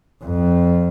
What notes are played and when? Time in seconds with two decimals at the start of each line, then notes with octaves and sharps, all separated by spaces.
0.24 F2